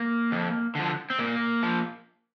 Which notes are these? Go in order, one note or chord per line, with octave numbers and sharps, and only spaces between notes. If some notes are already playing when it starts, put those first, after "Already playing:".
Already playing: A#3
F2
D3 F3
C4
A#2 A#3
F3